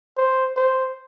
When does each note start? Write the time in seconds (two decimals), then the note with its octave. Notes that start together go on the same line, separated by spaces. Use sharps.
0.17 C5
0.57 C5